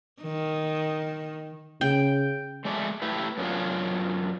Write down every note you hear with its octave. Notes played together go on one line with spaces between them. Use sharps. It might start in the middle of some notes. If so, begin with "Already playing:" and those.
D#3
C#3 G5
G#3 A3 D5
A3 E4 G4 B4
F#2 B3 C#4 D4 F4